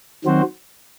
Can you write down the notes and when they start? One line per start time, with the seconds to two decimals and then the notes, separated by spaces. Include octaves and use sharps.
0.25 D#3 F#3 C4 F#4 C5